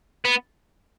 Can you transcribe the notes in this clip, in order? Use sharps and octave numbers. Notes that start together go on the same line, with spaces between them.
B3